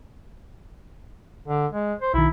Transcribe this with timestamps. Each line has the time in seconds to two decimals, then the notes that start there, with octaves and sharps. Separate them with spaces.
1.48 D3
1.72 G#3
2.01 C5
2.14 B1 D#3 E4